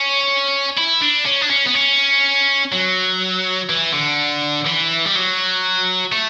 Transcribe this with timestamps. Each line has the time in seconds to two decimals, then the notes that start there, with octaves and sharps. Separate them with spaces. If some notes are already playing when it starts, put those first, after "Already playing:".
Already playing: C#4
0.77 E4
1.02 D4
1.26 C#4
1.42 D4
1.50 C#4
1.67 B3
1.75 C#4
2.72 F#3
3.70 E3
3.93 D3
4.66 E3
5.06 G3
5.15 F#3
6.12 A3